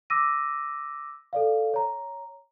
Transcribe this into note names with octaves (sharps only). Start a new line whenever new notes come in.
D6 E6 A#6 D#7
A4 D5 F5
C#5 A#5